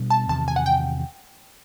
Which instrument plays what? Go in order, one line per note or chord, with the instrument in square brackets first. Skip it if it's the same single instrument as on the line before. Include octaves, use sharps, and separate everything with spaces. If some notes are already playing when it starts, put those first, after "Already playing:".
Already playing: [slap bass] B2 G3 B3 D4
[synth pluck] A5
[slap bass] E2 C3 D#3 [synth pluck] A5
[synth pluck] G#5
F#5
G5